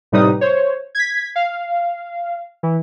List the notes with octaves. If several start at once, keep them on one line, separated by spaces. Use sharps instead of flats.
A2 C3 G3 D#4 B4 D#6
C5 C#5
G#6 B6
F5
E3